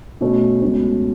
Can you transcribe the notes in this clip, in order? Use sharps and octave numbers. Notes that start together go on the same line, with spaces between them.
B2 A3 C#4
C#2 B2 A3 C#4